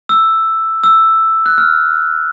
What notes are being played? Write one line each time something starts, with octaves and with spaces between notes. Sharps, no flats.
E6
E6
F#6
F6